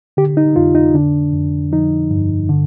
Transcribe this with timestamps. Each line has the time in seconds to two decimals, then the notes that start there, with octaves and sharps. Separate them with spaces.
0.17 D3 G4
0.37 D#4
0.56 F2 F4
0.75 D#4
0.94 D3 D4
1.33 F2
1.72 F3 D#4
2.11 G2
2.49 D3